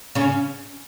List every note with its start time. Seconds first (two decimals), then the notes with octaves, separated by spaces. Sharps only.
0.15 C#3 C#4